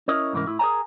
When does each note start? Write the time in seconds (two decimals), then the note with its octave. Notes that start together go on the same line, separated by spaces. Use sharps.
0.08 C#4 E4 A#4 C#5 D#5
0.33 C2 G#2 E3 C#4 A#4
0.47 A2 E4
0.59 G#4 A#4 C5 C#5 G#5 A#5